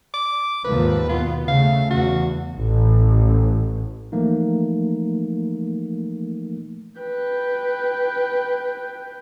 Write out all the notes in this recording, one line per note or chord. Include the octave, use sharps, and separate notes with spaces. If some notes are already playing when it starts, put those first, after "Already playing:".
D6
D#2 G#2 F3 B4
B2 B3 F4
C#3 A3 F5
E2 F#4
A1
E3 F3 A3 A#3 D#4
B4 G5